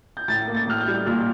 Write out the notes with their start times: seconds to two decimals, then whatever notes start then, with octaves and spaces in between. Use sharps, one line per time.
0.17 G6
0.28 A2 A6
0.47 A#3
0.54 A6
0.67 A2 F6
0.81 G6
0.88 G3
1.07 A#2 F6